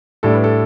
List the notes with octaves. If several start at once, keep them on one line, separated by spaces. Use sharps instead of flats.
A2 G3 D4 A4
B4
A4